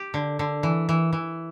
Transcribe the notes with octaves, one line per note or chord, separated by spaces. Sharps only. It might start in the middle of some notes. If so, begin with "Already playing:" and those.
Already playing: G4
D3
D3
E3
E3
E3